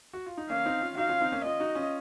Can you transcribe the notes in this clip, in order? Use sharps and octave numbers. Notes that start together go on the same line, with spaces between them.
F#4
F4
D#4
A#3 C#4 F5
C4 D#4
C#4 F4
D#4 F#4 F5
C#4 F4
C4 D#4
A#3 C#4
C#4 F4 D#5
D#4 F#4
C#4 F4